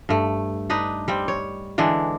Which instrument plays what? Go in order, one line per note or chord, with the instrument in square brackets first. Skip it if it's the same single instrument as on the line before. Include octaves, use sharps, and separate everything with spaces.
[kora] G2 A3
D4 D#4 B4 D#5
G3 C4 G5
C#5
D3 E3 G#3 D4